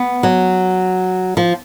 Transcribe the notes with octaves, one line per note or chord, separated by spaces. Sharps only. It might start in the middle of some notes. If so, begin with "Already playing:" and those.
Already playing: B3
F#3
F3